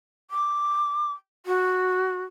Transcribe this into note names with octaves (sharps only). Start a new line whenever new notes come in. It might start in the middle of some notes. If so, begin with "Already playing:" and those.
D6
F#4